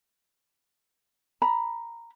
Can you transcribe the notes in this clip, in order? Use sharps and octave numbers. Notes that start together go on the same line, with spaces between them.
A#5 B5